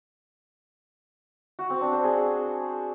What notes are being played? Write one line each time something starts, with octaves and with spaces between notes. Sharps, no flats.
F#4
C4
D4
C5
G#4